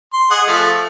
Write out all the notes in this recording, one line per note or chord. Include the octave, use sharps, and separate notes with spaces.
C6
G#4 D#5 F#5
F3 A3